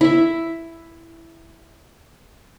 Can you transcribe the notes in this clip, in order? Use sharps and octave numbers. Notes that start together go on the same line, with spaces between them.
E4 E5